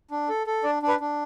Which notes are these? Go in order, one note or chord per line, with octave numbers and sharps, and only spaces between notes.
D4
A4
A4
D4 D5
D4
B4
D4